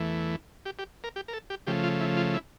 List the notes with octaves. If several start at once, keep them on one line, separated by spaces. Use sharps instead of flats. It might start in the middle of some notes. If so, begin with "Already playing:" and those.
Already playing: E2 E3 A3
G4
G4
A#4
G4
A#4
A4
G4
C#3 F3 A3 G4
F4
E4
F4
E4